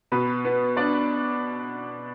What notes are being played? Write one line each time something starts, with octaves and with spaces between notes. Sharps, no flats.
B2 B4
B3
D4 D5